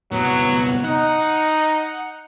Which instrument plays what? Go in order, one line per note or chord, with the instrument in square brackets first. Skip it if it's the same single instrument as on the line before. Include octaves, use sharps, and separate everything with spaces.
[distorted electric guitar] C2 B3 [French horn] F#3
[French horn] D#4 [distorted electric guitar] F#5